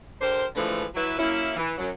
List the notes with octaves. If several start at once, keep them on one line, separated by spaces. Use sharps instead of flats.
D3 G4 A#4 C5
D3 E3 F3 G#3 A3 B4
F#3 E4 B4
F#3 A#3 C#4 E4
E3
F#2 F#3